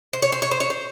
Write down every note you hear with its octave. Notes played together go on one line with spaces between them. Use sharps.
C5
C#5
C5
C#5
C5
C#5
C5